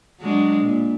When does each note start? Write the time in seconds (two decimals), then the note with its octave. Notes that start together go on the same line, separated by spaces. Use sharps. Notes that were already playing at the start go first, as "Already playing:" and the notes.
0.20 F#3 G#3 D4
0.61 A#2